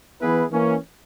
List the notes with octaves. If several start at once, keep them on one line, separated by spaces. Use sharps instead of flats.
E3 B3 E4 G#4 B4
E3 A#3 C#4